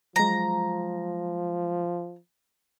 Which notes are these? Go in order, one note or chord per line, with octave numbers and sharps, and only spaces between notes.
F3 F#3 G#3 A#5